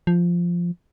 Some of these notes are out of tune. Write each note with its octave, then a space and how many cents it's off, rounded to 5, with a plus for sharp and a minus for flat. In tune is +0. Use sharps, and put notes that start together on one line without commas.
F3 -5